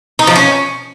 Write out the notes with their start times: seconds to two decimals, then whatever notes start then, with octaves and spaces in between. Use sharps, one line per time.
0.19 D#4
0.27 F3
0.35 C#4